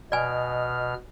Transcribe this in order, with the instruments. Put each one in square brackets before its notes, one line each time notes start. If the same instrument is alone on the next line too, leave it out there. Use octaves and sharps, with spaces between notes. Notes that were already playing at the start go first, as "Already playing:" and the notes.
[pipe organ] B2 F6 [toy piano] D5 G#5 [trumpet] D#5